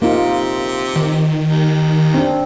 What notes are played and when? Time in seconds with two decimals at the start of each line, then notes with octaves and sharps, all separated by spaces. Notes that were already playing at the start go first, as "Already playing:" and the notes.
0.02 C3 A#3 D#4 F4
0.96 D#3
1.49 D#2
2.14 C4 D4